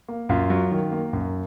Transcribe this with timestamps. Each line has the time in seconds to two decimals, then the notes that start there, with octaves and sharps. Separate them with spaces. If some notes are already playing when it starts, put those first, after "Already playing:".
0.08 A#3
0.29 F#2 F4
0.50 F#3
0.71 D#3
0.92 A#3
1.13 F#2